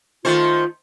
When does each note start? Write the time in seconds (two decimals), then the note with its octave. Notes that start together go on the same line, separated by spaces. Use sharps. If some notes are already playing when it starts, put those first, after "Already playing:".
0.25 D#3 A3 F4 C5